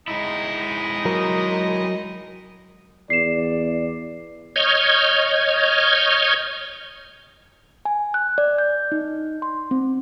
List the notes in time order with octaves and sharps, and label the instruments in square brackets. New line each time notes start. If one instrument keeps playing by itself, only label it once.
[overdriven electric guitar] G#3 E4 [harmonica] D#4 D#5
[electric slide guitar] F#3 A#4
[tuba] E2 [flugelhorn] D5 [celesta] C7 E7
[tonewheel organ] C#5 D#5 F6 G6 G#6
[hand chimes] G#5
F#6
D5
G6
D#4
C6
C4